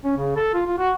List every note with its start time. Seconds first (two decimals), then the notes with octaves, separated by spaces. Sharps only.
0.04 C#4
0.17 C#3
0.36 A4
0.54 F4
0.66 F4
0.79 F#4